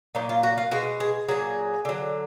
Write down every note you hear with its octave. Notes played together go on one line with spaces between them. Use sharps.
A#2 F#3 D#4
F4
F#4
F4
B2 G#3 F#4
G#4
A#2 F#3 G#4
D3 F#3